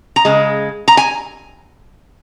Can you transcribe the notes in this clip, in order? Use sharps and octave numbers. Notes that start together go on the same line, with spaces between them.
A#5
C#3 G#3
A#5
G#5